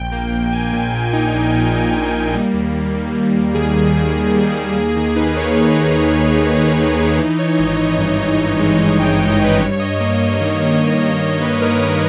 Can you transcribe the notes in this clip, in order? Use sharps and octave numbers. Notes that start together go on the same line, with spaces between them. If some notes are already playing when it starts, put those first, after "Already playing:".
Already playing: A#1 G5
A#3
A#1
A#3 G#5
A#2
A#2
D#4
A#1
A#2
A#3 G5
D#4
A#3
G3
D#2
D#2
D#2
G3
D#2
D#3 G#4
D#2
D#2
D#2
G3
D#2
A#3 G#4
D#3
D#4 B4
A#3 C#5
D#4
D#3
A#3
D#4
D#4
D#3
D#4
D#4
E3
E3 C#5
G#1 D#5
G#1
G2
G#1
G2
G#3
G#3
G#1 G5
G5
G#1
D#5
G2 B4
G2 C#5
C#5
G2 D#5
A#3 D#5
G2
D#3
D#3
D#3
D#3
G2
G2 B4
D#3 A#4
D#3 B4